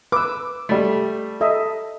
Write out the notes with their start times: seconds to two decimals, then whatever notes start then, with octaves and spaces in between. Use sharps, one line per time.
0.12 B4 D6 E6
0.69 G3 A3
1.41 A4 D#5 E5